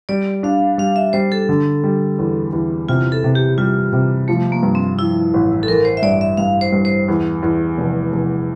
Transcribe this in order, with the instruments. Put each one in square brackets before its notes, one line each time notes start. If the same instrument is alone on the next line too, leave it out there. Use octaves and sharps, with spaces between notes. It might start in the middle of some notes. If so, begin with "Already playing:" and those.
[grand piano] G3 [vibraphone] D5
[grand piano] D4 [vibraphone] F5
[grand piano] G3 [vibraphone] F5
[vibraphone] E5
[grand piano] G3 [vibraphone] C5
[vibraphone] A4
[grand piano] D3
G3
E2
E2
[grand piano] C3 [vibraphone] F4
[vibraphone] A4
[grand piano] C3
[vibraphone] G4
[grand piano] G3 [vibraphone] F4
[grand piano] C3
[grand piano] F3 [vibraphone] A3
[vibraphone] A#3
[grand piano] G2
[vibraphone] C4
[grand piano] F3 [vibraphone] E4
[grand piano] A1
[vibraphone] A4
[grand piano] E3 [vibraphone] A#4
[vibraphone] C5
E5
[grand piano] G2 [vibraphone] D5
[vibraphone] E5
[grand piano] G2 [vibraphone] F5
[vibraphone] C5
[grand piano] G2
[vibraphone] C5
[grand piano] E2
E2
F1
F1